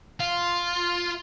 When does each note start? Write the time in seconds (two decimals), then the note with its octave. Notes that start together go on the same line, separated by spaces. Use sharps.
0.20 F4